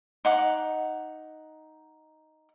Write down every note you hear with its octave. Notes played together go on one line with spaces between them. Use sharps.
D#4 F#5 D6